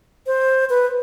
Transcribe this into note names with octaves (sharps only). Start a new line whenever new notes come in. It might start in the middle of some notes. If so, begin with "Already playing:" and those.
C5
B4